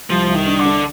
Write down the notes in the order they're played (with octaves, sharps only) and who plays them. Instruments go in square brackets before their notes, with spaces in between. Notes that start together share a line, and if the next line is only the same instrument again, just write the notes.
[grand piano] C2 [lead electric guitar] F3
[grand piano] C2
[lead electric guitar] D#3
[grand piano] D4
[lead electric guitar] D3
[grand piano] D4